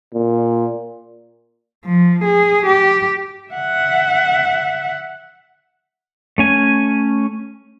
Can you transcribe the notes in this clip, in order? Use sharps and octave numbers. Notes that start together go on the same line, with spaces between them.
A#2
F3
G#4
G4
E5 F#5
A3 C#4 G#5